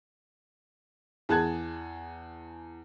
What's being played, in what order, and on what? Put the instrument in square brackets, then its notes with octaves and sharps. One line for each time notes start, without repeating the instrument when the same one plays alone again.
[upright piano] E2 G#4 A5 F#6 G#6